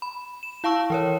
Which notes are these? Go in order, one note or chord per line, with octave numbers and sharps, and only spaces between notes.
B5
E7
E4 F5 A5 C#6 E6
E3 A#4 C#5